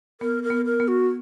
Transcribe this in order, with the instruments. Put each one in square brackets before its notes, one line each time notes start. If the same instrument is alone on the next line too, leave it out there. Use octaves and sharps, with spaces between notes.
[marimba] B3 [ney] A#4
[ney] A#4
[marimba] B3
[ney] A#4
[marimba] B3
[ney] F#4